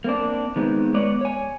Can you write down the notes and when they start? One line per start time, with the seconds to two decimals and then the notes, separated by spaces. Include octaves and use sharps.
0.04 A#3 C4 D4
0.56 D#3 G#3 B3 C4
0.94 G#3 B3 C#5 D5
1.21 C#5 G#5